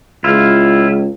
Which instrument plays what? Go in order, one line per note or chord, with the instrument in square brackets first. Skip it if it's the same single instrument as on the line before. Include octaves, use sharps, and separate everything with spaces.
[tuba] C#2 [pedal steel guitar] E4 F4